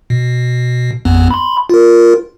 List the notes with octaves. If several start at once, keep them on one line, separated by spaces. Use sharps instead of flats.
B2
A1 F2 B3
B5 C6
F4 A#4